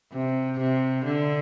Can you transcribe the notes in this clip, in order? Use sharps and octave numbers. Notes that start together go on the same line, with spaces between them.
C3
C3
D3